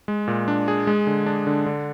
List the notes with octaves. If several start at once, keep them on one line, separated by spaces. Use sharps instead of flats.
G#3
A#2
D4
G#4
G#3
D3
D4
D3
D3